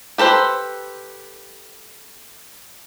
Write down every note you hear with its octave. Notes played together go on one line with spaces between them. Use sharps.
G4 A4 B4 C5